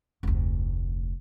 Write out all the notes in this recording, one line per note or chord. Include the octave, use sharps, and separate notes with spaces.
F1 D2